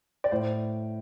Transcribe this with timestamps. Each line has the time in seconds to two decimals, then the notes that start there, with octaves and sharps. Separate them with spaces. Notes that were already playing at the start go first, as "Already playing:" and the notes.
0.24 D5
0.31 A2 C5